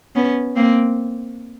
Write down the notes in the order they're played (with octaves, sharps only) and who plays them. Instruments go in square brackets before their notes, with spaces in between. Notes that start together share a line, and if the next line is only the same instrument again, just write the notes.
[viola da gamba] B3 C#4
A#3 C4